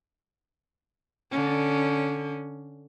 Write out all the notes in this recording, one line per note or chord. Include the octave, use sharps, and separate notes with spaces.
D3 C#4